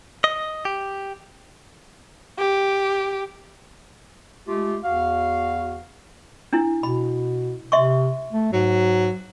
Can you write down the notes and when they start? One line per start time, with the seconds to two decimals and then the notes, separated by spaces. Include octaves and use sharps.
0.24 D#5
0.65 G4
2.39 G4
4.48 G#3 A3 F4 G4
4.84 E2 F#4 F5
6.53 D4 E4
6.83 B2 B5
7.72 C3 E5 C6 C#6
8.33 A3
8.53 G#2 F#3